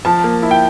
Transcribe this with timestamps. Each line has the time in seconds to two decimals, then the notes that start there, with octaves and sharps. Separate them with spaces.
0.05 F3 A5
0.24 A#3
0.43 E4
0.51 G5